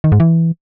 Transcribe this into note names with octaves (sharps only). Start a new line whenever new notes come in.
D#3
G#2
E3